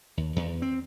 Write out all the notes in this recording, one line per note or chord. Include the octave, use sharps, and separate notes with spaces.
D#2
E2
C4